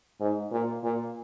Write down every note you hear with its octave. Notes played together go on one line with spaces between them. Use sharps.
G#2
A#2
A#2